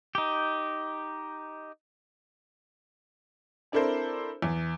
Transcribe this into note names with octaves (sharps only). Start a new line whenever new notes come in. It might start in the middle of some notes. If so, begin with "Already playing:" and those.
D#4 G4
C4 D4 E4 A4 A#4 C5
E2